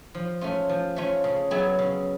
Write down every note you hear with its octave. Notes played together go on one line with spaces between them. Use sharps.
F3
A3 C#4 F4
F3
A3 C#4 F4
C#3
F#3 B3 E4 G#4
C#3